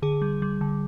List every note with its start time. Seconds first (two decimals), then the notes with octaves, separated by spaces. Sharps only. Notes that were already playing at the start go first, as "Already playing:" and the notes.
0.02 D3 G#4
0.22 G3
0.42 G3
0.61 D3